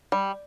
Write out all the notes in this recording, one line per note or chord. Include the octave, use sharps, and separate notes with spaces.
G3